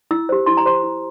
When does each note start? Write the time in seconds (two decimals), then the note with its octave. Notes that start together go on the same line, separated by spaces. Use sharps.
0.11 E4 E6
0.29 G4 C5
0.46 E4 C6
0.57 A#5
0.65 G4 C5 C6
0.83 E4